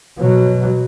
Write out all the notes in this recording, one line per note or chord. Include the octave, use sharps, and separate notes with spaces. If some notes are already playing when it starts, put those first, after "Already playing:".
B2 F#3